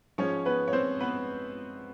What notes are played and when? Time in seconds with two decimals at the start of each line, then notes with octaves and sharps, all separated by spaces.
0.18 G#2 F3 C#4 C#5
0.45 B3 B4
0.68 C#5
0.73 C4 C5
1.01 B3 B4